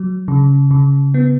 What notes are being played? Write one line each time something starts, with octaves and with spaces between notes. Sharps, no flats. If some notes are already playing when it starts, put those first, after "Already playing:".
Already playing: F#3
C#3
C#3
B3